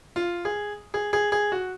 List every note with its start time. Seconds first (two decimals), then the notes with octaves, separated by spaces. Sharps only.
0.16 F4
0.45 G#4
0.94 G#4
1.13 G#4
1.32 G#4
1.52 F#4